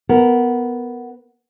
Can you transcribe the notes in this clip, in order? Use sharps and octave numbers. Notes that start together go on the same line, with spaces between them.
B3 A#4